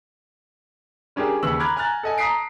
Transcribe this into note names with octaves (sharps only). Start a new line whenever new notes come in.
G3 C#4 D4 G4 G#4 A#4
D#2 C#3 B4 C#6 E6 F#7
A#5 B5 D6 F6 F#6 G#6
G#5 A#5 F6 F#6 A6
A4 D#5 G#5
A5 A#5 D#6 B6 C7 D7